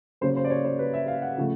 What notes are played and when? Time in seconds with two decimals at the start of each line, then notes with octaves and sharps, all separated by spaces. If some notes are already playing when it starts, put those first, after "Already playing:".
0.21 C#3 F#3 A#3 C#4 C5
0.36 C5
0.44 D5
0.50 C#5
0.64 C5
0.79 B4
0.94 E5
1.08 F5
1.22 F#5
1.38 C#3 F3 A3